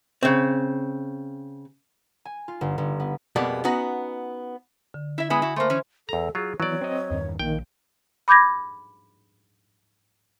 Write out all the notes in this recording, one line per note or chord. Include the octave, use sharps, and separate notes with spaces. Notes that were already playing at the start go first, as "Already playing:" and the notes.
C#3 C4
G#5
F4
G1
G1
B3
F2 B2 G3 G#3 A#3 B3
B3 C#4 D#4 F#4
D3
E4 E5
G#3 B3 E4 G#5 B5 D#6
E4 F#4
A3 A#3 C5 E5 C6
E3 C#4
E2 A4 A#5
F#3 F4 G#4
E3 F#3 B3 C#5 D5
C4 D#5
E2 G2 D#3
A#1 D#3 A#3 G5
B5 D6 G6 G#6 A#6